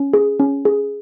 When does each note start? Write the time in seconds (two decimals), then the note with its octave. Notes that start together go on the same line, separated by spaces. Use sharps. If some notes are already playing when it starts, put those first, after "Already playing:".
Already playing: C#4
0.13 G#4
0.40 C#4
0.65 G#4